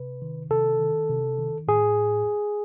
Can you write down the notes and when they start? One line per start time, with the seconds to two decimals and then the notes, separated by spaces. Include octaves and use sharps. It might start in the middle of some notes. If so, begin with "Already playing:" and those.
Already playing: C3 B4
0.22 D#3
0.51 C3 A4
0.79 D#3
1.09 C3
1.38 D#3
1.68 A2 G#4